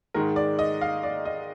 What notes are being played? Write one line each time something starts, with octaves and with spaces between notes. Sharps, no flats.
G#2 D#3 G#3 A#4
D5
D#5
F5
D5
D#5